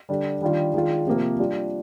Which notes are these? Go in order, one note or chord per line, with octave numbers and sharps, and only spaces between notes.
D3 G3 D4
D#3 G3 D4 F4
D#3 G#3 D4 F4
C3 F3 A#3
G3 D4 F4